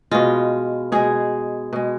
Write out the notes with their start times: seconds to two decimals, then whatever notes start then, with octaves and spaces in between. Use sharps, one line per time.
0.11 B2 G#3 F4
0.92 B2 G#3 G#4
1.73 B2 G#3